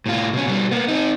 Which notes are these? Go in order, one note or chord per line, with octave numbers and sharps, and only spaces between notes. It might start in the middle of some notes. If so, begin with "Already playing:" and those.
A2 F4
B2 C#4
B2 G3
A#3 B3
C4 D#4